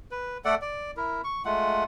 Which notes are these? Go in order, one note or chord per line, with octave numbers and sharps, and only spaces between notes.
B4
A3 A4 D5 F#5
D5
E4 A#4
C#6
G#3 A3 F4 F#5